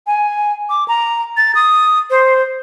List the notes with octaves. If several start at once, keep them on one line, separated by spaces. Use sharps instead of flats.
G#5
D6
A#5
A6
D#6
C5